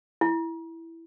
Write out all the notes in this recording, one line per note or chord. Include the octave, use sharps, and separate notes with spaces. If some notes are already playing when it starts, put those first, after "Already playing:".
E4